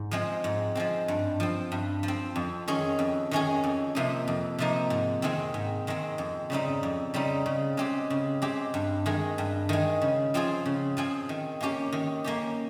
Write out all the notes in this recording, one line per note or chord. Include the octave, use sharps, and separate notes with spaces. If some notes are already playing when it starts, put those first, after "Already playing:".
Already playing: G#2
F3 G#3 C4
G#2
F3 G#3 C4
G2
F3 C4
G2
F3
C4
F2
D#3 G#3 C#4 G#4
F2
D#3 G#3 C#4 G#4
F2
C3 F3 A#3 D#4
F2
C3 F3 A#3 D#4
G#2
D#3 G#3 C4
G#2
D#3 G#3 C4
F2
C#3 G3 C4 D#4
F2
C#3 G3 C4 D#4
C#3
G#3 C4 G4
C#3
G#3 C4 G4
G2
D#3 G#3
G2
D#3 G#3
C#3
F3 C4 F4 G#4
C#3
F3 C4 F4 G#4
D#3
A#3 C#4 G4
D#3
A#3 C#4 G4